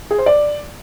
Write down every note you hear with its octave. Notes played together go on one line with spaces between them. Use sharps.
G#4
C5
D5